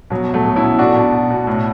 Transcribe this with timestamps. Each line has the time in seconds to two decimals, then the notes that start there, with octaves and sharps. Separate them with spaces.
0.10 B2 F#3
0.28 B2
0.34 F#3 A3
0.45 B2
0.56 C#4 E4
0.62 B2
0.79 B2 D4 F#4
0.96 B2
1.12 B2
1.30 B2
1.47 A2